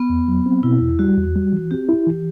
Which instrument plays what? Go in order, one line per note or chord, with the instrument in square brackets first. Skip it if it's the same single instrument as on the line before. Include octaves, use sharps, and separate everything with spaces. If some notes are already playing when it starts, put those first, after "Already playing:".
Already playing: [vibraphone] B3
[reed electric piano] E2
F#3
C4
[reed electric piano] B2 [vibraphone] E4
[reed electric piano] E2
[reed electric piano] G3 [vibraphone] F#4
[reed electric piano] E2
G3
E3
[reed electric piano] C4 [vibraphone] G4
[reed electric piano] E4
E3